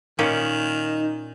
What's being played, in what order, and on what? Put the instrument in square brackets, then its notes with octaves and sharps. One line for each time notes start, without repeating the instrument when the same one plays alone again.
[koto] A#2 C#4 [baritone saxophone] D#3 [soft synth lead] D#4